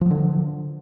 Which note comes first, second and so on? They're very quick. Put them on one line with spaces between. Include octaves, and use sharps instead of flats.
F3 F#3 D3